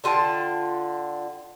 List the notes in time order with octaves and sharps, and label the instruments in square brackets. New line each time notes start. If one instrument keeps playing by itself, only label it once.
[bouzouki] D3 F4 G5 A5